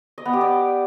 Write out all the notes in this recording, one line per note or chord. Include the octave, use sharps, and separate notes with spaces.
D#5
B3
G4
D5